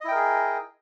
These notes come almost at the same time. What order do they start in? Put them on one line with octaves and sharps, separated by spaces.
D#5 E4 G5 A#4 G#4